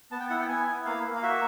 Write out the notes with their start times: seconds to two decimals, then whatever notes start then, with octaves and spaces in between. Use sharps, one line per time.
0.11 B3 A5
0.20 G5
0.30 E4 F#5
0.40 G5
0.48 B3 G#5
0.67 E4
0.85 A#3 F5
1.04 A#3
1.15 F5
1.23 F#4 E5